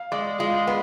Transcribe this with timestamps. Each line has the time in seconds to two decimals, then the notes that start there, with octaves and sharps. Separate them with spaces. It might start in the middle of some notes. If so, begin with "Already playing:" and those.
Already playing: F5
0.12 G#3 D5
0.39 G#3 F4
0.67 B3